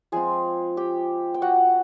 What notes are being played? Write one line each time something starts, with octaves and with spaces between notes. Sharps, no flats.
F3 G#3 C4 F4 G#4 G#5
G4 G5
G5
F#4 F#5